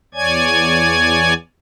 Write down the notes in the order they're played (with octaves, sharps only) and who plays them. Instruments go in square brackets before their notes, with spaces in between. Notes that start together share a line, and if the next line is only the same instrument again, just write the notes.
[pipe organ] E2 C#5 D5 G#5 G#6